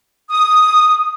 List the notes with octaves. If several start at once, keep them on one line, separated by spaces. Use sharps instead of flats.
D#6